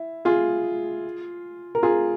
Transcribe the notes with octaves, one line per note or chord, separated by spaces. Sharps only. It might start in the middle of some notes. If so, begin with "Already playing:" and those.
Already playing: E4
F4 G#4
A#4
F4 G#4